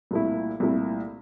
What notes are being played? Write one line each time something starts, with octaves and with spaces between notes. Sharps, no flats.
C2 A#2 A3 E4
C2 A#2 A3 E4